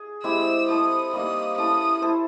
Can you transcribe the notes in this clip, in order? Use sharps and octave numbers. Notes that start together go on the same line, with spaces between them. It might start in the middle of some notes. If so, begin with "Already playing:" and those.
Already playing: G#4
G#3 C4 E4 G4 E6
C4 E4 A4 D#6
G3 A#3 D#4 D#6
C#4 E4 A4 D#6
E4 A4 C5